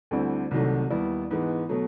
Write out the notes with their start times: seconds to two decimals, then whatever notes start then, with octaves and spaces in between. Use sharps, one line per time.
0.11 D2 D3 G3 C4 E4
0.51 C2 C3 D#3 F#3 A3
0.90 D#2 D#3 G3 B3 E4
1.31 G#2 E3 G#3 B3
1.69 B2 F#3 A3